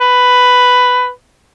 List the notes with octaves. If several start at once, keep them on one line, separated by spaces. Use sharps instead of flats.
B4